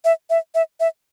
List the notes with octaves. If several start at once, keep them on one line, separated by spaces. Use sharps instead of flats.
E5
E5
E5
E5